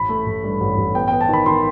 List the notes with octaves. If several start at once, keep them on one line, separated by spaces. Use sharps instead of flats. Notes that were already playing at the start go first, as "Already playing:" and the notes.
Already playing: A1 B5
A3
A1
G2
A1
A1
B3 G5
G5
B3
A5
D#3 B5
D#3 C6